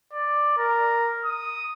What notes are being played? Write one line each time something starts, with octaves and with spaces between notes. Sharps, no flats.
D5
A#4
D#6